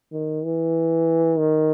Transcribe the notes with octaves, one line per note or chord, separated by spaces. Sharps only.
D#3
E3
D#3